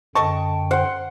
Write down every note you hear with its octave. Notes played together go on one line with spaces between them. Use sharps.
F#2 D3 A4 D#5 G5 A5 C#6
C5 F#5 C6